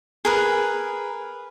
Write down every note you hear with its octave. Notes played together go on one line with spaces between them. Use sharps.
G#4 A#4 B4